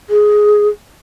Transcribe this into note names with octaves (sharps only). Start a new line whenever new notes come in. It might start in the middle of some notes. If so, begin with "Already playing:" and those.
G#4